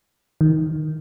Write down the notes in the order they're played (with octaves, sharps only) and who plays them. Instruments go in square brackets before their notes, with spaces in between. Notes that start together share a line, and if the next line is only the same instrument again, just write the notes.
[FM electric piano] D#3